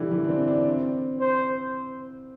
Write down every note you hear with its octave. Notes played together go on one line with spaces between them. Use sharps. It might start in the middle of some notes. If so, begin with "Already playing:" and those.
Already playing: D3 E3 G3
E3
D4
C4
D4
C4
C5